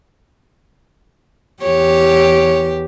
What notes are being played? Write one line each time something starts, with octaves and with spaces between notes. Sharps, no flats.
E2 G4 C#5